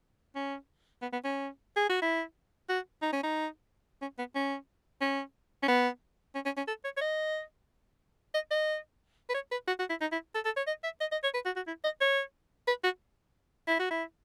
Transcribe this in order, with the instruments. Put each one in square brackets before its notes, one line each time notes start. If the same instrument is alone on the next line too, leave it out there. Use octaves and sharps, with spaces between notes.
[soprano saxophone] C#4
B3
B3
C#4
G#4
F#4
E4
F#4
D#4
C#4
D#4
C#4
B3
C#4
C#4
C#4
B3
C#4
C#4
C#4
A4
C#5
C#5
D#5
D#5
D#5
B4
C#5
B4
F#4
F#4
E4
D#4
E4
A4
A4
C#5
D#5
E5
D#5
D#5
C#5
B4
F#4
F#4
E4
D#5
C#5
B4
F#4
E4
F#4
E4